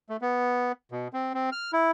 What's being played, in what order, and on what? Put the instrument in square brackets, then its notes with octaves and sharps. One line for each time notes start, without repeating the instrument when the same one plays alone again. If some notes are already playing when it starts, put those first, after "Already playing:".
[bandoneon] A3
B3
B2
C4
C4
F6
E4